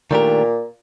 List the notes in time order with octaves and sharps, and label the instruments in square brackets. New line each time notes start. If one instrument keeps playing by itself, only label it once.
[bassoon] A#2 [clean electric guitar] D#3 A3 D4 G4 A#4